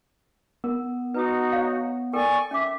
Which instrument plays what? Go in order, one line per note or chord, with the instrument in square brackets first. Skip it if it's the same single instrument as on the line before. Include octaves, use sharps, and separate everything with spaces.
[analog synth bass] B3 [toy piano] A#4
[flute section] D#4 F#4 [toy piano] B4 D#6
[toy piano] C#5 F5
[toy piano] A4 A#4 G5 [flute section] D5 G#5 C#6
[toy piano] C#4 D6 [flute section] E5